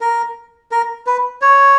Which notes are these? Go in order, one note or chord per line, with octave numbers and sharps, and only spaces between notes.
A#4
A#4
B4
C#5